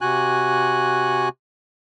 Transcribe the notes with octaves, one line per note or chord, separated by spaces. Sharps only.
C3 F#4 G#5 F#6